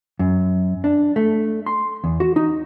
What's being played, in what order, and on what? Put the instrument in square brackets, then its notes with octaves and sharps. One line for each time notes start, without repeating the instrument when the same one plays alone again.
[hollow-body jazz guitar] F#2
D4
A3
C6
E2
F#4
D#4